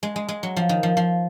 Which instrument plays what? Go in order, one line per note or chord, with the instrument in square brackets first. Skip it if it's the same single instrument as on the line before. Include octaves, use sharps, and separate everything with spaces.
[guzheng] G#3
G#3
G#3
F#3
F3
D#3
F3
F3